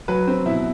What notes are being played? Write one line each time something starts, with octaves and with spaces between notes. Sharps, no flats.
F#3 B4
C4
B2 E4